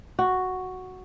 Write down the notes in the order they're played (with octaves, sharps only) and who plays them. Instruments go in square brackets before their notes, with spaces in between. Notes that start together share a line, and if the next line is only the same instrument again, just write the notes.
[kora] F#4